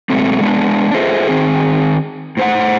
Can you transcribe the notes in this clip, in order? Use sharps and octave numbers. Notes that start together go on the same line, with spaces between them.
B2 F#3 G#3 A3 C4
G#3 B3 D4
F4 G#4 A4 C5 D#5 E5
D#3 C4 G#4
A2 C5 F#5